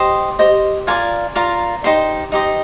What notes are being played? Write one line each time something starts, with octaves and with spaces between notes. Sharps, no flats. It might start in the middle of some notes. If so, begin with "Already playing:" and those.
Already playing: G4 C5 D#5 C6
G4 C5 D#5
F4 A#4 D5 G#5
F4 A#4 D5 A#5
D#4 G4 C5 C6
D#4 G4 C5 D#5